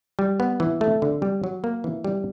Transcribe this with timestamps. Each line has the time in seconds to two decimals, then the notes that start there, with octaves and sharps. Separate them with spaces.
0.19 G3
0.40 B3
0.60 E3
0.81 A3
1.02 D3
1.22 G3
1.44 F#3
1.64 A#3
1.84 E3
2.04 G3